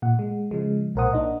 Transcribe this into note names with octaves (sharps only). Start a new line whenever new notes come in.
A#2 F#5
G#3
C#3 F3 G#3
B1 A#2 A#4 C5 F#5 D#6
A#3 D4 D#4 D#5